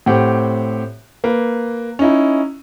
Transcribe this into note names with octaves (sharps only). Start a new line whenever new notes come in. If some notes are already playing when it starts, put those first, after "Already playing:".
A2 C4 G4 F#5
A#3 B4
C#4 D#4 E4